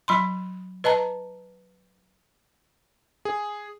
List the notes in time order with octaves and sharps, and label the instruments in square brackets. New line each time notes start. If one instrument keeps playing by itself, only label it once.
[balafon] F#3 B5 C6
B4 D#5 A5 A#5
[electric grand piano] G#4